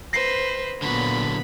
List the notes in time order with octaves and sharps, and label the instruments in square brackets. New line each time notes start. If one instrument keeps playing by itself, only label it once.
[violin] B4 C5 [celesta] A#6 C7
[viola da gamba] A#2 B3 [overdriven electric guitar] D3 F#3 [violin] B5